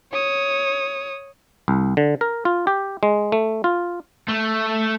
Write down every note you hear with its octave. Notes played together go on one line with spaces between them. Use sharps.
C#5 D#6
C2
D3
A#4
F4
G4
G#3
A3
F4
A3